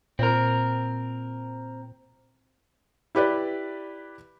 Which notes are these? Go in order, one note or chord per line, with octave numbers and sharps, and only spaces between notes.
A#2 C4 A#4
E4 G4 B4 D5